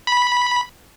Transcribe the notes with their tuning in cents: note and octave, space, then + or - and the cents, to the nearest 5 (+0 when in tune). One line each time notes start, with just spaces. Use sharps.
B5 -10